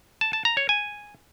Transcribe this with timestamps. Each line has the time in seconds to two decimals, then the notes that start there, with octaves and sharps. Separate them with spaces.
0.21 A5
0.33 A5
0.45 A#5
0.57 C#5
0.69 G#5